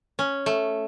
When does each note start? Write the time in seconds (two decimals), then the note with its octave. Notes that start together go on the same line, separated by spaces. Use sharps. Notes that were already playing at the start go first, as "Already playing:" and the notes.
0.19 C#4
0.46 A3